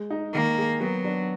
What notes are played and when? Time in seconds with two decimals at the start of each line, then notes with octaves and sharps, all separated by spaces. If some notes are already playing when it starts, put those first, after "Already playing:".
Already playing: G#3
0.10 D#4
0.34 D#3 A#3
0.58 G#4
0.81 F#3 B3
1.04 D4